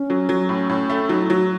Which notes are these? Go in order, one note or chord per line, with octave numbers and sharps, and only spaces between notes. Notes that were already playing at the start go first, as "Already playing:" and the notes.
Already playing: C#4
F#3
F#3
A2
A2
A3
F#3 D#4
E4
F#3
F#4